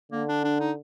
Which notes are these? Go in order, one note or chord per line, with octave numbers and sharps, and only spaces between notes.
D3 A#3
D4
D4
D#4